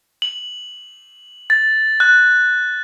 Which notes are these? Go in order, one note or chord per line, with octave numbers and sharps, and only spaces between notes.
F#7
A6
F#6